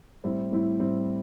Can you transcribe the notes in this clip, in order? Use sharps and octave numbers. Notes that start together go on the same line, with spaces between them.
A2 G3 C4 E4
A2 G3 C4 E4
A2 G3 C4 E4